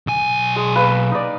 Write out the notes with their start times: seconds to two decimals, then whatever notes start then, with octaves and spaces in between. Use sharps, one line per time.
0.07 B1 G#5
0.56 G#3
0.76 A#3 B4
1.11 D#4 D5